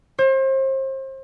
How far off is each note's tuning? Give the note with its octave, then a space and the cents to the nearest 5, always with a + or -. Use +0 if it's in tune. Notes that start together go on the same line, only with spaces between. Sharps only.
C5 +35